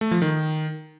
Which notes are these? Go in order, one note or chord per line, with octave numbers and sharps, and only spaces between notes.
A3
F3
D#3